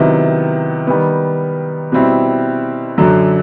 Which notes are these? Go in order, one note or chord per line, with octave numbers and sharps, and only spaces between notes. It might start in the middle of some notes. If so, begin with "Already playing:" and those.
Already playing: C3 D#3 F#3 B3 E4
D#3 G3 B3
B2 G3 C4 E4
F#2 D3 F#3